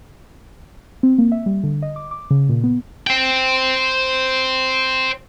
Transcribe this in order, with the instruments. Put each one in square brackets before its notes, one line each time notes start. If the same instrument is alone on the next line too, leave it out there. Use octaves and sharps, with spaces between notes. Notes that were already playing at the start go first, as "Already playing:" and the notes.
[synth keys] C4
A#3
E5
G3
D3
D#5
D6
D6
C#3
A#2
B3
[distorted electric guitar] C5 G5